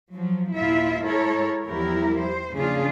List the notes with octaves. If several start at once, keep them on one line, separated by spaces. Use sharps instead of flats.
F3 F#3
D#2 A#2 E4 F4 E5
G#3 E4 A4 A#4 C#5
E2 F3 G3 E4 G4 A#4
C5
C#3 F3 A#3 D4 F4 G#4